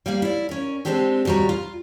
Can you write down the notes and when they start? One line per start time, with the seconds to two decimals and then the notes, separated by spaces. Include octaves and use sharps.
0.06 G3 A#3 D5 F5
0.22 E4 D5
0.49 C#4 A#4
0.85 G#3 A#3 C4 D4 G4 A4
1.25 D#2 A#2 G3 F#4 A#5
1.49 F4